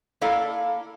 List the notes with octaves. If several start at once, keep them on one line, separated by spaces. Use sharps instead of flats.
A#3 E4 A4 D5 F5